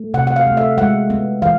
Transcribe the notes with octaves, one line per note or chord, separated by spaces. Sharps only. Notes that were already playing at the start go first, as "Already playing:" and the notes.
Already playing: A3
C3 F#5
F#5
F5
A3
E5
G#3 F#5
B3
E3 F5